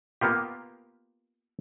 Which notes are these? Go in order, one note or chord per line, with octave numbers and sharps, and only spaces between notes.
A#3 B3 F4 G4